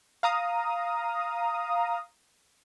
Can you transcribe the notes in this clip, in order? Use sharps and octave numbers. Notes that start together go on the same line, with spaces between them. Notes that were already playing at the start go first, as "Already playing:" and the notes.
F5 A#5 D#6